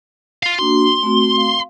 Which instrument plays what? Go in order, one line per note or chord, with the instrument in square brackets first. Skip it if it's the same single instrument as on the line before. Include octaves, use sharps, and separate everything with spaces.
[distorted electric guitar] F4 F5
[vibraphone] A#3 D4 F#4 [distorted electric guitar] C6
[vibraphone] A3 C4 F#4
F5